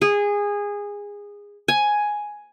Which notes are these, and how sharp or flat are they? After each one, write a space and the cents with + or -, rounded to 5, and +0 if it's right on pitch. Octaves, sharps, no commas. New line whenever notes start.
G#4 -20
G#5 +5